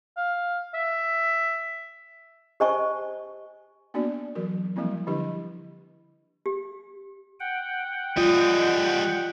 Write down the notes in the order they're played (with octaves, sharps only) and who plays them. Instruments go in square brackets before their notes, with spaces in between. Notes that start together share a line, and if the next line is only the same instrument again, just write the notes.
[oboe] F5
E5
[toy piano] G4 C5 D#5 G#5 A5 C#6
[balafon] A#3 B3 D4 F#4 D5
E3 F#3 F#4 A#4
F3 G3 A#3 C4 E4
D3 F3 D4 E4 G4 D#5
[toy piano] G4
[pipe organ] F#5 G5
[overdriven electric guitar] G3 D#5 [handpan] F4